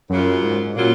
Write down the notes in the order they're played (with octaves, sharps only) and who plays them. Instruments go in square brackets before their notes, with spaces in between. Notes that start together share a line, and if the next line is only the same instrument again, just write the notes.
[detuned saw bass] F#2 [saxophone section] C#3 F#3 A#3 F4
[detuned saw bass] G#2
[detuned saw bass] A#2 [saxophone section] C#3 F#3 A#3 F4